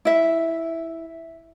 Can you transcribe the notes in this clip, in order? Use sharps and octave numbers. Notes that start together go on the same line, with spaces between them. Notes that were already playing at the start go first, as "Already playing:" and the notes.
E4 E5